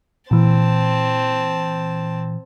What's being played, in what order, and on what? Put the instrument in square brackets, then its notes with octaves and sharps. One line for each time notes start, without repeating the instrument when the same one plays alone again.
[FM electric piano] A#2 E3 [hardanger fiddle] C4 A5